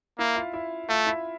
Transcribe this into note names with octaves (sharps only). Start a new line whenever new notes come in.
A#3 E4 E5
F4 F5
E4 E5
A3 F4 F5
E4 E5